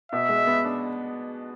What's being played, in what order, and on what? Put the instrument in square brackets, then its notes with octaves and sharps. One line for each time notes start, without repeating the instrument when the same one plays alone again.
[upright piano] B2 [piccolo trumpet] E5
[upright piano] G#3
B3
D4